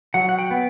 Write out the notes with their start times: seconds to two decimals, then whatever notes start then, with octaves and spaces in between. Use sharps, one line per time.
0.14 F#3 F#5
0.29 F#5
0.39 G5
0.51 B3